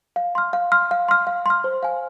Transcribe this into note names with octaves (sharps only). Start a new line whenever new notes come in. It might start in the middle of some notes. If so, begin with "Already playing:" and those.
F5
C6 F6
F5
C6 F6
F5
C6 F6
F5
C6 F6
C5
F5 G#5